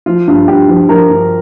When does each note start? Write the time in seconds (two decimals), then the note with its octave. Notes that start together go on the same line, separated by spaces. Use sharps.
0.06 F3 F4
0.28 G2
0.48 G2 G4
0.68 F3
0.89 F3 A#4
1.09 G2